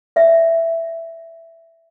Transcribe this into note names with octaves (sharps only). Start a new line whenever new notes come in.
D5 E5